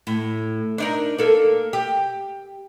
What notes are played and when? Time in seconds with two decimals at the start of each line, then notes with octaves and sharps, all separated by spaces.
0.07 A2
0.78 D4 D#4 A#4
1.18 A#3 A4
1.73 G4